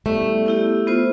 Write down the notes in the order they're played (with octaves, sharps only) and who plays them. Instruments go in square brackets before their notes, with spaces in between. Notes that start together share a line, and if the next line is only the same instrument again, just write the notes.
[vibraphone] G3 B3 E4 G4 D5 [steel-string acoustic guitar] A3
[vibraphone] B3 E4 G4
B3 F4 C5